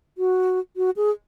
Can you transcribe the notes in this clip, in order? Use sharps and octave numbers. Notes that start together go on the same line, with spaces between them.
F#4
F#4
G#4